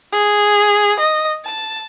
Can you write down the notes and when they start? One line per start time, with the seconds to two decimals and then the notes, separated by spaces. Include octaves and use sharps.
0.12 G#4
1.00 D#5
1.45 A5